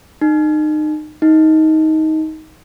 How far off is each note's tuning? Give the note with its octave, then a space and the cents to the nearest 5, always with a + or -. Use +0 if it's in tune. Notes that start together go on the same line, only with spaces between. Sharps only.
D#4 -30
D#4 +15